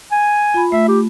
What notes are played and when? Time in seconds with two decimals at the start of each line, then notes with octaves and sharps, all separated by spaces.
0.12 G#5
0.54 F4 B5
0.72 A3 E5
0.88 G4